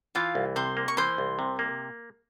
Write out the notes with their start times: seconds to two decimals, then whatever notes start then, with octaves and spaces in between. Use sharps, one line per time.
0.15 E3 F4 F5
0.35 C2
0.56 C3 C5 C6
0.77 A#3
0.88 C#6
0.97 E3 C5 C6
1.18 C2
1.39 C3
1.59 A#3